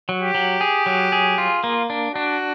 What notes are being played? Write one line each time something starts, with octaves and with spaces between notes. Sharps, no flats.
F#3
G4
F#3
G#4
F#3
G#4
F4
A#3
D4
D4 F#4